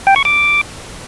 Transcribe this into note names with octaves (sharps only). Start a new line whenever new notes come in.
G5
C#6
D6